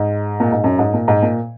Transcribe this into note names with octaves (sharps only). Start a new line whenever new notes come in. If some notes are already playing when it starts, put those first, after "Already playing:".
Already playing: G#2
A#2
G#2
F#2
G#2
A#2
G#2
A#2